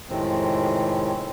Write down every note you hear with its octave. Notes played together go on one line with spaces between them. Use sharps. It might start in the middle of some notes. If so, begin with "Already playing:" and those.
F2 A2 C3 D#3 G#3 C4